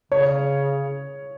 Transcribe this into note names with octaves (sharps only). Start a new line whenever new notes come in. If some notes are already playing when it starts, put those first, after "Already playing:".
C#3 C#5